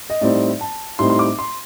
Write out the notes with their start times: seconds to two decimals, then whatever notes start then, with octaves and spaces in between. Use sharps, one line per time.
0.10 D#5
0.21 A2 G3 C4 D#4 D5
0.61 A5
0.99 A2 G3 C4 D#4 C6
1.10 C6
1.19 D6
1.39 C6